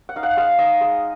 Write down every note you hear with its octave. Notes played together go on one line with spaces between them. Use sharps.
F#5
D#4 F5
F#5
G#3 F5
D#4 D#5
G#3